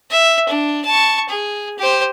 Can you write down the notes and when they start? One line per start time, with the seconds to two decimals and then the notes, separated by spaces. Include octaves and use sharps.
0.11 E5
0.49 D4
0.85 A5 C#6
1.29 G#4
1.79 G4 C5